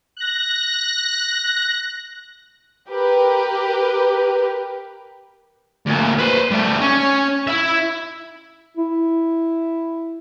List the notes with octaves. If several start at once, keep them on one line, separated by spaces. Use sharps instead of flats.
F#6 A#6
G4 A#4 B4
D2 A#2
B4 C5
G3 A3
C#4 C#5
E4 E5
E4